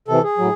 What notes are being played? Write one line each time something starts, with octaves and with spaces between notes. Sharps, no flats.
C3 E3 A4
G#4
A2 F#3